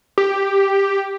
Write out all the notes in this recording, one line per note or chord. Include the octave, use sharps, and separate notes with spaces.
G4